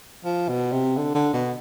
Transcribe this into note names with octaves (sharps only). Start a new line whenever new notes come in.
F3
B2
C3
D3
D3
B2